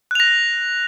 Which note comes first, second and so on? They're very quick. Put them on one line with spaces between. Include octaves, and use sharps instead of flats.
F#6 F7 A#6